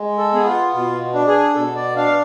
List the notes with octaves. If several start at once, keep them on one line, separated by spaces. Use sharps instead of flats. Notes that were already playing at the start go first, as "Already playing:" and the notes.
Already playing: G#3
A4
B3 G#4
F4
B2 F4
D4
G#4
B2 A4
D5
D4 F5